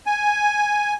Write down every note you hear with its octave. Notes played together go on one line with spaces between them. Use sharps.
G#5